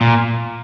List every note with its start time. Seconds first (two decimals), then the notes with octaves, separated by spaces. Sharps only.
0.01 A#2